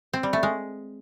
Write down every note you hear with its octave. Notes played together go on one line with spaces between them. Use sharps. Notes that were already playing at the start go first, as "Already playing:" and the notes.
C4
G3
A3
G#3